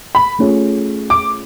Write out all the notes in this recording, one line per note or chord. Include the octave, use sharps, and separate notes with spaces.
B5
A3 C#4 F4 G#4 C#5
D6